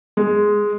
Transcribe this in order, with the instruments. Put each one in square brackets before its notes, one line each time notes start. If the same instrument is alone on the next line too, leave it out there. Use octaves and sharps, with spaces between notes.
[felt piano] G#3